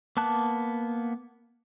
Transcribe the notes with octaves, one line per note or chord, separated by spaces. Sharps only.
A#3 B3 A5 F#6